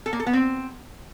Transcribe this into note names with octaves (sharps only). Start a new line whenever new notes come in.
A4
A#3
A4
B3
C4